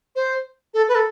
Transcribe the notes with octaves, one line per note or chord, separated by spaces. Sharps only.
C5
A4
B4
A4